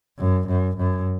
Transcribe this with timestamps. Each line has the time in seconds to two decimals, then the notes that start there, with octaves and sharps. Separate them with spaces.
0.19 F#2
0.48 F#2
0.78 F#2